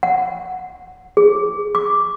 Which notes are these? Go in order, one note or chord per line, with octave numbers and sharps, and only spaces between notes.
F#5
G#4
D6